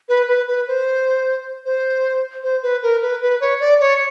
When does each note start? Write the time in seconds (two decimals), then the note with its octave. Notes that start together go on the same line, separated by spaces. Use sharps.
0.09 B4
0.28 B4
0.48 B4
0.68 C5
1.65 C5
2.43 C5
2.63 B4
2.83 A#4
3.02 B4
3.22 B4
3.41 C#5
3.61 D5
3.80 C#5